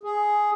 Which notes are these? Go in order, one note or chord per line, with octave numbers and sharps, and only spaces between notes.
G#4